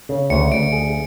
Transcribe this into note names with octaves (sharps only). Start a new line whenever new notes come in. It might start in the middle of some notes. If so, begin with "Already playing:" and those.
C#3
D2 C#7
D2 D7
G#4